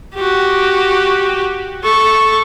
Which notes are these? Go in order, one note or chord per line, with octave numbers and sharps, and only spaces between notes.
F#4 G4
A4 C#6